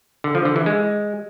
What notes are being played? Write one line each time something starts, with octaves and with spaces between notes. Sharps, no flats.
D3
F3
D3
E3
G#3